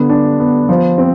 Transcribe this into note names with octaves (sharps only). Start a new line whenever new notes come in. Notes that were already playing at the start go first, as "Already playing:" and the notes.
Already playing: D3 B3
D4
B3
F3
C4